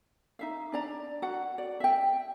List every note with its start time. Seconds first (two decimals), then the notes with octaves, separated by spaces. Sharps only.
0.39 D#4 E5 F5
0.72 D4 D5 A#5
1.22 F#4 F#5
1.58 D5
1.80 E5 G5